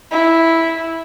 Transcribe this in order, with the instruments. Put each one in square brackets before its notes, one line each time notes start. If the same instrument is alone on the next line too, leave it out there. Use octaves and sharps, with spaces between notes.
[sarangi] E4